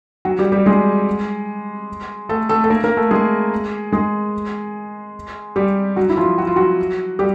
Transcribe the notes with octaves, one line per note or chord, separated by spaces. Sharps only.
F#3 F#4
G3 G4
G3 G4
G#3 G#4
A3 A4
A3 A4
A4
A#3 A#4
A#3 A#4
A3 A4
G#3 G#4
G#3 G#4
G3 G4
F#3 F#4
E4
F3 F4
F#4
F4
F#3 F#4
G3 G4